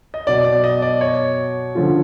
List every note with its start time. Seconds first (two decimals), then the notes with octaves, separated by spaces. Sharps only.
0.14 D#5
0.27 B2 F#3 B3 D5
0.45 D5
0.64 D#5
0.82 D5
1.01 C#5
1.75 D3 F3 A3 C#4 F4